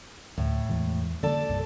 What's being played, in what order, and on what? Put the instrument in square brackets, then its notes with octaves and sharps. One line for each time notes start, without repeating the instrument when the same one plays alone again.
[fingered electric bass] D2 [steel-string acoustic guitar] A2
[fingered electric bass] E2 E3 G#3
[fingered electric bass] D3 A#3 [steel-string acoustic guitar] A4 D5
[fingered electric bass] C2 G2